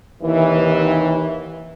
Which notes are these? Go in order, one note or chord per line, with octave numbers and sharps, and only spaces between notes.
D#2 C3 E3